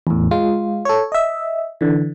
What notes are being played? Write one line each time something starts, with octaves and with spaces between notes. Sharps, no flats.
E2 A2
G#3 F4
A4 C#5
D#5 E5
D3 E3